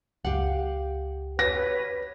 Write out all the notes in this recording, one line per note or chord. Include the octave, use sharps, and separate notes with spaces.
C#2 G4 F5 F#5
B4 C#5 A#6